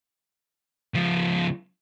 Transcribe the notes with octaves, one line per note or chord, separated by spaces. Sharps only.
C#2 F3